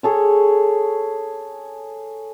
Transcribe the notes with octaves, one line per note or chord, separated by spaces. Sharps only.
G#4 A4 C#5